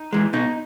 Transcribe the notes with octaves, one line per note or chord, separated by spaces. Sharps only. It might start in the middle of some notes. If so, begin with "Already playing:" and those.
Already playing: D#4
E3 G#3
B2 D#4